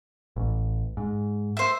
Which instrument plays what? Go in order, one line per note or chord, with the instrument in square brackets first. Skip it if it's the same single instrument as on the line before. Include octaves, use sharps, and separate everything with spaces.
[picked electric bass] A1
G#2
[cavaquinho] C5 E5